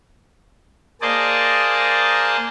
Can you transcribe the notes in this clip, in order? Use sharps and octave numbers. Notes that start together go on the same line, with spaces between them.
A#3 G#4 C5 D5 D#5 A5